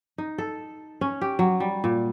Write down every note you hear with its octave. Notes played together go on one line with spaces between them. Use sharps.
D#4
A4
C#4
G4
F#3
G3
A#2